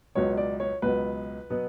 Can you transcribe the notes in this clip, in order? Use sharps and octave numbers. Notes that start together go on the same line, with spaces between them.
C#2 B2 F#3 B3 C#5
D5
C#5
C#2 B2 F#3 B3 B4
B2 F#3 B3